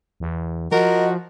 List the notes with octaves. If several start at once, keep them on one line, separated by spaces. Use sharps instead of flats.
E2
F3 F#4 A#4 D#5